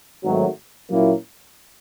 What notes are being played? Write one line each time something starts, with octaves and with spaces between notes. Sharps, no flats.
G#1 G#2 D#3 F#3 A3
A#2 F#3 A#3 C#4 E4